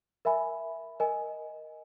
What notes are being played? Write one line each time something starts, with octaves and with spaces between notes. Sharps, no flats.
A#4 E5 G#5 B5
A#4 D#5 G#5